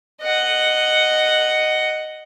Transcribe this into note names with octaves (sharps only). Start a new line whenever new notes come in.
D#5 F#5